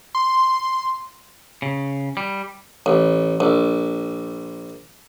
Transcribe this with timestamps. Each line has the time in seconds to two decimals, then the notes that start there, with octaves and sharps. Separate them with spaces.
0.15 C6
1.62 C#3
2.17 G3
2.86 A1
3.40 A#1